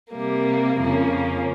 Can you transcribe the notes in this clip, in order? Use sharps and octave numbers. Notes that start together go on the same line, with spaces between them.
C3 G3 A#3
F2 C#3 F3 A#3 C#4